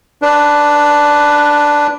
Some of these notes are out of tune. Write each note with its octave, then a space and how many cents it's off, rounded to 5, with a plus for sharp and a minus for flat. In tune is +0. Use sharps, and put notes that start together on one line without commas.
D4 +0 B4 +0